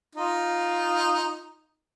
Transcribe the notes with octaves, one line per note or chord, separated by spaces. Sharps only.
D#4 F4